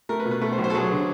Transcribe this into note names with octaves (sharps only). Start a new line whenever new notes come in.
A3 A#4
B4
B2
B4
A3 B4
C5
B1
C5
A4
F#3 G#4
D3